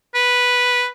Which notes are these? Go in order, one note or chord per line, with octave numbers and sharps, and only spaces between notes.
B4